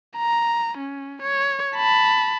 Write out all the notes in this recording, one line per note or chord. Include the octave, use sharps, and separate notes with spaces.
A#5
C#4
C#5
A5 B5